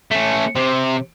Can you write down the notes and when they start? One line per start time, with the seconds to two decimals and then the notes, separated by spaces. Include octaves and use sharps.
0.11 A3 C#4
0.56 C3